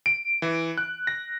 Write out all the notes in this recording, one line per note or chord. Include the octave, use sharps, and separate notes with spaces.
D7
E3
F#6
A#6